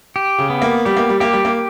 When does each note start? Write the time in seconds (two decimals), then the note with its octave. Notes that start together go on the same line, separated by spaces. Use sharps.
0.16 G4
0.38 C#3
0.50 B3
0.62 A#3
0.85 G3 G4
0.97 A#3
1.09 G3
1.20 A#3 G4
1.33 G3
1.45 A#3